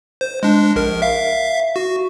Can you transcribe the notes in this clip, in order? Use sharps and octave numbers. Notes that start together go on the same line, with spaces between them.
C5
G#3 D4
A#1 A#4
E5 F5
F#4